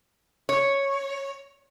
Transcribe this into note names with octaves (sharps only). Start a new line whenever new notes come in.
C#5